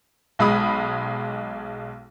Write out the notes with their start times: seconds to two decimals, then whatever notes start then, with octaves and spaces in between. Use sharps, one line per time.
0.39 B1 G#3 B5 D#6